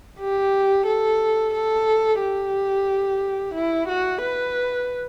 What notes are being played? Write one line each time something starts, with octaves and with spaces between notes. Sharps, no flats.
G4
A4
A4
G4
E4
F#4
B4